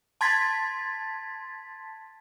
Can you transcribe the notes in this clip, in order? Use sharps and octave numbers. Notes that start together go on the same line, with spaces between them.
A5 C6 G#6 A6 B6